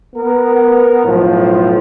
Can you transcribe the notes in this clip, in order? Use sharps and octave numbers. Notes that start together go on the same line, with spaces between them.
B3 A#4
B1 A2 F3